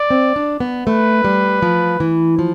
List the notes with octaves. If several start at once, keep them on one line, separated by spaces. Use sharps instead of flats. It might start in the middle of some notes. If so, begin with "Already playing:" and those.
Already playing: D5
C4
D4
B3
A3 B4
G3
F3
E3
F3